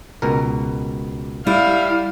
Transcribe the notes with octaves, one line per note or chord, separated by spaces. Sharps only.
C#2 B2 A#4
G3 E4 F5